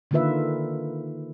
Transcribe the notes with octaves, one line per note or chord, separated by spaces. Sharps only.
D3 D#3 A#3 F4 B4 E5